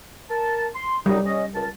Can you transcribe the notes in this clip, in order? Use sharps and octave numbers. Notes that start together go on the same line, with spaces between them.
A#4 A5
C6
F#2 F#3 G3 D#4
C#4 D#5
C#2 A#4 A5